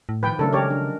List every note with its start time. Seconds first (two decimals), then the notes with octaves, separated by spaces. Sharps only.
0.09 A2
0.23 D#3 F3 B4 G5
0.39 C#3 F#3 A3 D4 A4 A#4
0.53 G#3 C#4 G4 A#4 C#5 D5
0.70 D4